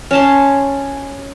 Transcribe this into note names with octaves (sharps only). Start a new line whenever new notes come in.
C#4 A5 C6